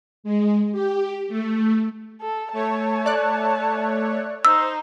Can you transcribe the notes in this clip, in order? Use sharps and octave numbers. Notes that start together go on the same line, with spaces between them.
G#3
G4
A3
A4
A3 C#5 A5
D5 F#6
D#4 C5 E6